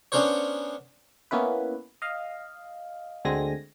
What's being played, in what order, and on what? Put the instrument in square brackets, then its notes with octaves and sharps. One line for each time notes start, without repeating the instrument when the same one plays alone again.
[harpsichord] B3 C#4 D4 A#4 C5 C#5
[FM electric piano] A#3 B3 C#4 E4 B4
D#5 F5
D2 D3 G#3 C4 G#5 A#6